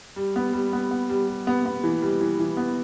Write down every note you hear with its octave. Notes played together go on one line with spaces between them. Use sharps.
G3
B3
G3
B3
B3
G3
G3
B3
B3
E3
G3
E3
E3
B3